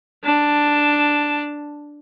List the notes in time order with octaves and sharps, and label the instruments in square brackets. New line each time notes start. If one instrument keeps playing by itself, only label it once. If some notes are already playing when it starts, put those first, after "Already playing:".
[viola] D4 A5